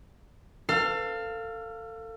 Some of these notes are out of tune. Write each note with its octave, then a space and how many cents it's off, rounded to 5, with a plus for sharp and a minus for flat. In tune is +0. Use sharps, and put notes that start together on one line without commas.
A4 +30 F5 +0